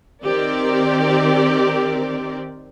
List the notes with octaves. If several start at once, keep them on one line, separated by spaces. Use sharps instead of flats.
D#3 C4 G4 A#4 D5